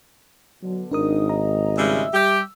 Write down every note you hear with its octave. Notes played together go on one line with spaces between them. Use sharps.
B2 D3 F#3
G#1 D4 D#4 A#4 D#6
D#5 A#5
C#3 G3 G#3 E5 E6
G3 G4